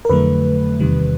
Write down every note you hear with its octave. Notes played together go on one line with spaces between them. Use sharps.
A#4
F2 D3 F#3 A3 B4
E2 C3 D#3 G3